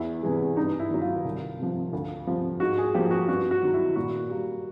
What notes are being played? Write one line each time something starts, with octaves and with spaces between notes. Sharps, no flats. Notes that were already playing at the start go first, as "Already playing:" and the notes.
Already playing: E2 E4
C3 E3 G#3
G2 D#4
E4
D#3 F#3
F4
C2
C3 F3
D2
C3 F3
G#2 F#4
G#4
F3 A#3 G4
F#4
G2 F#4
F#4
D#3 F#3
E4
A#2 F#4
G3 A#3